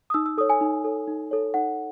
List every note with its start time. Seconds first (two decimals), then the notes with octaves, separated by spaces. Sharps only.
0.10 D#6
0.14 D#4 E6
0.26 E6
0.38 A4 C#5 D#6
0.50 G#5
0.61 D#4
0.84 A4 C#5
1.07 D#4
1.31 A4 C#5
1.54 D#4 F#5